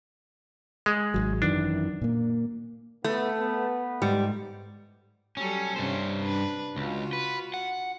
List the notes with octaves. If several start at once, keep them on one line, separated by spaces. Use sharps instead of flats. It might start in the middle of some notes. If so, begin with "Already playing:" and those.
G#3
G#1 F#3
F#2 D#3 E3 D4
A#2 A#3
A3 B3
B3
G#2 G3
F#3 G3 C#4 A4
G2 C3 C#4 C5
D4 B4
C#2 F4 F#4
B4
F#5